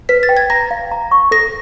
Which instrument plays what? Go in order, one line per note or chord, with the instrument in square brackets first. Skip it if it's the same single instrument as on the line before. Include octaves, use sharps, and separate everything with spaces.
[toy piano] B4 [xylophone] B6
[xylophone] A6
[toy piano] G5
[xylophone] G#6
[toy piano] A#5 [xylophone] A#6
[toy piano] F5
A#5
C#6
[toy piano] A4 [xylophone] A#6